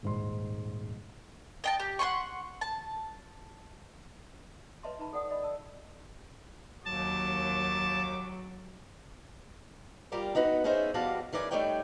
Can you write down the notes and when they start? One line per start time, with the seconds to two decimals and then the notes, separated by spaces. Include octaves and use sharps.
0.03 D#1 G#2 C6
1.64 D#5 G5 A5
1.80 G4
1.99 F#5 G#5 C6 C#6
2.61 A5
4.83 B4 C#5 D#5 E5 A5 C6
4.99 D#4 B4 A5 B5
5.13 A4 D5 F#5 G5 D#6
5.29 D5 D#5 B5
5.42 D5 A5 E6
6.85 D#2 F#3 A5 D6
10.12 G3 F4 G4 A#4 D5
10.35 B3 D#4 F#4 B4
10.64 B3 C#4 D#4 G#4 C5 E5
10.94 E2 G3 F#4 D5 F5 A5
11.33 C#3 E3 A#4 D5 G#5
11.51 G3 A3 D#4 C#5 D5 G5